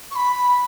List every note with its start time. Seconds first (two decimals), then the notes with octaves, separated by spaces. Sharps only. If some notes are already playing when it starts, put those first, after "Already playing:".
0.11 C#6
0.15 B5